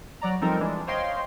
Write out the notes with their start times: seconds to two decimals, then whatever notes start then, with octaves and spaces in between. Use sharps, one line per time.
0.21 F#3 D5 A#5
0.41 F3 G3 C4 D#4 A4 A#4
0.60 E3 G#3 D4
0.87 C5 C#5 D#5 F5 G5 C6